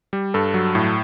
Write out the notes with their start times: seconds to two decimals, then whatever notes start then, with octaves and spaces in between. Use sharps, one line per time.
0.13 G3
0.34 G2 A4
0.54 F#3
0.75 A2